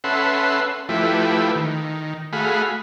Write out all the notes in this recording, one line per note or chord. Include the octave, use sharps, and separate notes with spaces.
C#4 A4 B4 E5 F#5 C6
F3 A3 E4 G4 B4
D#3
A3 F#4 G#4 F5 B5